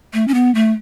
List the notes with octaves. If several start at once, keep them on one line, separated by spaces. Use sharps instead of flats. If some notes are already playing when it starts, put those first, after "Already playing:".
A3
C#4
B3
A3